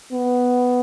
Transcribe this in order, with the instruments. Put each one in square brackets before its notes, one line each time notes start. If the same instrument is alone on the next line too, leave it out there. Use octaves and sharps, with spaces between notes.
[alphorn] B3